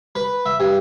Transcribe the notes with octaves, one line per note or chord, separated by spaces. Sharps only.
B4
E5
G2